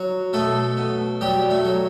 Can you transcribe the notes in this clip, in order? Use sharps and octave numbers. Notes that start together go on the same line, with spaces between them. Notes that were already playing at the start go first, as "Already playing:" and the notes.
Already playing: F#3
B2 A3 A4
B2
F#3 G3 G4
A3
F#3